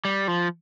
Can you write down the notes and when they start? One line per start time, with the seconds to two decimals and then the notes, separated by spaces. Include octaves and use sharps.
0.05 G3
0.28 F3